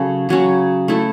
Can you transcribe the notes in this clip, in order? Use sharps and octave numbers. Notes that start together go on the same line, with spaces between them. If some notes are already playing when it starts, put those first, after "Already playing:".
Already playing: C#3 F#3 C#4 A4
C#3 F#3 C#4
A3 E4 A4